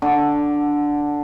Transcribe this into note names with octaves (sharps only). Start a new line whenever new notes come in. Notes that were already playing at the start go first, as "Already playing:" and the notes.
D3